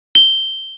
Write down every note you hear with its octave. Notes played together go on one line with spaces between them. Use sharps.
G7